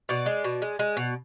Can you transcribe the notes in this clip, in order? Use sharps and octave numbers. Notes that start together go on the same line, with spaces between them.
B2 D5
G#3
B2
G#3
G#3
B2